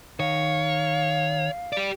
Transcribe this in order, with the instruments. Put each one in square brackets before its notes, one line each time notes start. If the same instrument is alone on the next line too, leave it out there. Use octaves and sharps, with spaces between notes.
[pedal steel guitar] D#3 [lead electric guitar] C#5 [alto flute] F5
[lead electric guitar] G4 D5